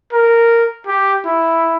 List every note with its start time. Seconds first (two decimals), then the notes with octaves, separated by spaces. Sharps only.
0.13 A#4
0.87 G4
1.25 E4